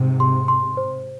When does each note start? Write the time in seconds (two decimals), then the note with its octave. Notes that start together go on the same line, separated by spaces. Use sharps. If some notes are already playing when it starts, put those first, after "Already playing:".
Already playing: G#2 C3
0.20 C6
0.48 C6
0.77 C5